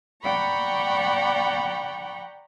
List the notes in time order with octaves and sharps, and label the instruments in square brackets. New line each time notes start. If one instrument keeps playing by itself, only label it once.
[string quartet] D5 F#5 G5 A#5 B5 C#6